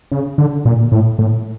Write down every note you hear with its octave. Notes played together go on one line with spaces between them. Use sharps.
C#3
D3
A#2
A2
A2